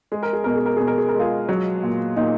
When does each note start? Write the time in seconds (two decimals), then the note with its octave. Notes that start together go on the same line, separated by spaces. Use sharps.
0.12 G#3 G#4
0.23 A#4
0.33 G#4
0.44 B2 A#4
0.55 G#4
0.66 A#4
0.76 B2 G#4
0.87 A#4
0.98 G#4
1.09 A#4
1.14 G#3
1.20 F4 G#4
1.49 F#3
1.83 A#2
2.17 A#2 D#4